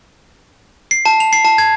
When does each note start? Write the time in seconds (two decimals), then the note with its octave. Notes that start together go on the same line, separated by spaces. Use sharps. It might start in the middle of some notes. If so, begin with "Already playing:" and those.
0.91 C7
1.06 A5
1.20 F7
1.33 C7
1.45 A5
1.58 G#6